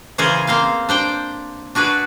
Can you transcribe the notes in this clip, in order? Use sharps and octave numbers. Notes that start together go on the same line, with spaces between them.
C#3 E3 F4 G#4 A#4 C5
A#3 C4 C5 F5
D4 C5 G5
D4 F#4 G#4 B4